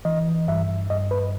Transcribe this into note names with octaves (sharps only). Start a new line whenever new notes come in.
E3 D#5
G2 E5
G2 D#5
B4